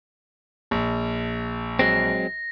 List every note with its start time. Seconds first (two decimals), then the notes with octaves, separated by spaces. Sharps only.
0.71 A#1
1.79 F#3 G#3 C4 A#6